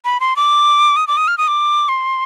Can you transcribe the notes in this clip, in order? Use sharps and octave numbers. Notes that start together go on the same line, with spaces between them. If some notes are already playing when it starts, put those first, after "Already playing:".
B5
C6
D6
D#6
D6
D#6
F6
D#6
D6
C6